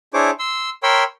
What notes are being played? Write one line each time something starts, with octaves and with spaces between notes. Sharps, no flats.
D4 E4 G#4 C5 C#5 D6
C6 E6
A#4 C#5 G5 B5 C6 E6